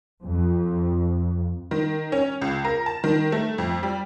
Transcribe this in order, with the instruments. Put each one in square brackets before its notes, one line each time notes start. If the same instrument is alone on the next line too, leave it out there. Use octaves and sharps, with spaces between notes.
[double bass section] F2
[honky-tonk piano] D#3
C#4
C#2
A#4
A5
D#3
A3
F2
G3